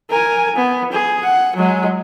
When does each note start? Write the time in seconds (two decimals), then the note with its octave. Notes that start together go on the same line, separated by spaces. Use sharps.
0.10 A#4 G#5
0.56 B3
0.92 G#4
1.23 F#5
1.56 F#3 G#3